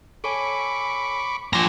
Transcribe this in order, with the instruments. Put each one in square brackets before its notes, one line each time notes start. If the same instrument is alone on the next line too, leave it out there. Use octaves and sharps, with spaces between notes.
[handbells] A4 C#5 G#5 [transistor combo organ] B5 C#6 D6
[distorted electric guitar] F3 A#5 [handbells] G#5 C6 D6